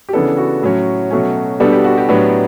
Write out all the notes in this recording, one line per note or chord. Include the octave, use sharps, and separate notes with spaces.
G4
C#3 E3 B3 D4 A4
F#4
A2 F#3 C#4
B2 F#3 A3 C#4
B2 G3 B3 D4 A4
G4
F#4
G4
A2 F#3 B3 D4